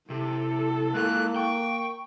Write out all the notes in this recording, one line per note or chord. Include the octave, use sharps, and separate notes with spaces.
C3 E4 A4
G#3 A#3 F4 F#6
G5 C#6